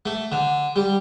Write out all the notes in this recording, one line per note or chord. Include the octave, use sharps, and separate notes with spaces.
A3
D3
G3